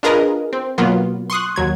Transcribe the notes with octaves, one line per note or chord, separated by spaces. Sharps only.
D4 F4 G#4 A#4 B4 D#5
C4
B2 F#3 A#3 B3 F4
C6 C#6 D#6 F#6
D#2 F#3 G#6